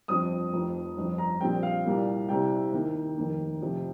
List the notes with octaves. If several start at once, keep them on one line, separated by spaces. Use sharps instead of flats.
G1 F2 F3 C4 D#6
F1 F2 F3
G1 F2 F3
A#5
A#1 A#2 G3 C4 G5
F5
C2 A#2 G3 A#3
C2 C3 G3 C4 G5
D#2 D#3 A#3
F1 D#2 D#3 A#3
F1 F2 C3 F3